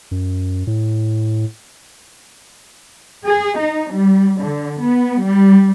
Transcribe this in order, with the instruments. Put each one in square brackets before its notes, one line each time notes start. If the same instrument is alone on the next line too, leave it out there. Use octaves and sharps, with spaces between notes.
[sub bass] F#2
A2
[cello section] G#4
D#4
G3
D3
B3
G3